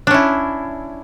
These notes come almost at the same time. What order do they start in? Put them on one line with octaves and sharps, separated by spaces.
D4 C#4 E4